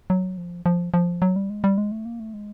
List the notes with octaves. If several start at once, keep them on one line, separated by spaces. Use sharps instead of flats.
F#3
F3
F3
F3
F#3
G3
G#3
G3
G#3
A3
A#3
A3
G#3